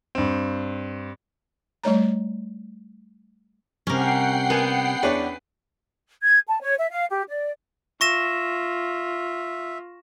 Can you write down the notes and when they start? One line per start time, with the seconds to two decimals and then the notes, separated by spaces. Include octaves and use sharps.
0.15 G2 C4
1.84 G3 A3 C#5 A#5
3.87 C3 G3 C#4 A#4 F#5 G5 C7
4.50 B3 A#4 G#5
5.03 E2 D4 B4 C#5
6.23 G#6
6.47 A5
6.61 C#5
6.78 E5
6.90 F5
7.10 G4
7.28 D5
8.01 F4 E5 C#6 A#6 E7